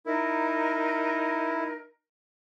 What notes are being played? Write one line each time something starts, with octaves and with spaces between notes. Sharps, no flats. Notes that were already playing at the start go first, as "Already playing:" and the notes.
D#4 E4 A#4